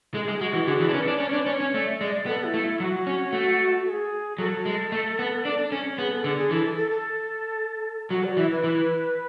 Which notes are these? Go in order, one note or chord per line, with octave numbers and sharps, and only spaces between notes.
G#3 A4
G#4
G#3
G#3 F#4
E3
D3 G#4
E3
D4
C#4 B4
D4
C#4 D5
C#5
D4
B4
C#4 C#5
C#4
A3 D5
E5
G#3 D5
B3 A4
E4
A3
E4
F#3 F#4
C#4
A3
A4
G#4
F#3 A4
G#3
A3
B3
D4
C#4
B3 G#4
A4
D3 G#4
G#4
E3 A4
A4
A4
A4
F#3 F#4
D5
E3 E5
B4
E3